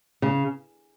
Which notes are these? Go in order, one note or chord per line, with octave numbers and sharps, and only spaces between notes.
C#3